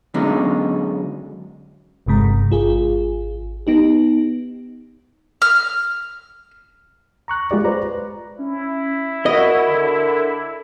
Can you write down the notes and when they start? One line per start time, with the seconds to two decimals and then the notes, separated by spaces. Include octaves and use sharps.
0.14 D3 F#3 G#3 B3 C#4 D#4
2.06 G1 G2 C3 G#3 A#5
2.51 G#1 F4 G#4
3.67 B3 D#4 G4
5.42 F6
7.28 A#5 C#6 F#6
7.51 G#3 F4 G4 D5
7.65 B4 C5 D5 A#5
8.39 C#4 E4
9.26 F#4 A#4 D#5
9.67 D3